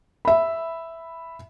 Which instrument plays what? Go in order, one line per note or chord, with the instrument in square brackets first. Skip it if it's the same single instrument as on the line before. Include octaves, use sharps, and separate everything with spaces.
[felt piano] E5 B5